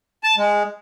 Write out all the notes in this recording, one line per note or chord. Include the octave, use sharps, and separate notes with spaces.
A5
G#3